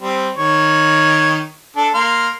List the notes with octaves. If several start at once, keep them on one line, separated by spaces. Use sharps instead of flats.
G3 C4
D#3 C#5
D4 A4
A#3 F5 C6